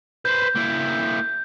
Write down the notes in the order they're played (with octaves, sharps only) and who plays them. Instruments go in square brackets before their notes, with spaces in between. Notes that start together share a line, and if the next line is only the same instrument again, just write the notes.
[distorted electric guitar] B4 C5 [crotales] G6
[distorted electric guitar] A#3 E4